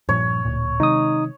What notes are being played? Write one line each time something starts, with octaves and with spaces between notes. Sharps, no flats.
G2 A#2 F3 C#5
D1 A#2
C3 D#3 G#3 D#4 D#6